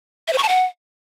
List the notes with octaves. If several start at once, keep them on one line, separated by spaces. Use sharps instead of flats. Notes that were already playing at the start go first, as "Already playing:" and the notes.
E5
C5
C#6
A5
F#5